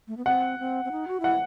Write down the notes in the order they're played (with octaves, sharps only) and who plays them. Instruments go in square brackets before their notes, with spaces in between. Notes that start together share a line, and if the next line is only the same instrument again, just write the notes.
[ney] A3
B3
[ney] C4 [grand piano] F#5
[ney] C4
C4
D#4
F#4
[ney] E4 [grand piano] F#5